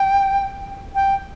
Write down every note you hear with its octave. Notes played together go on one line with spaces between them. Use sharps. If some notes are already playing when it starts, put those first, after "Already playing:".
Already playing: G5
G5